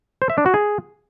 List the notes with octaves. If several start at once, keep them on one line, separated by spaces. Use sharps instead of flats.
C5
E5
D4
F#4
G#4